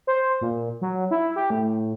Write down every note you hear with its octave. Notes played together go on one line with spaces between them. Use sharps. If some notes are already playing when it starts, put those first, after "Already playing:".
C5
A#2
F#3
E4
G4
A2